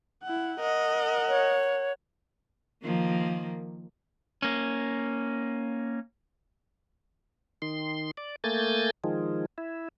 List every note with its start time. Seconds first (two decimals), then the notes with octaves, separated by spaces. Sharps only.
0.23 E4 F#5
0.60 A#4 D#5 F#5
1.28 C#5
2.83 D#3 F3 A#3
4.42 A#3 C#4
7.62 D#3 C6
8.17 D5
8.44 A3 A#3 G#5 G6 A6
9.04 D#3 F3 G#3
9.58 E4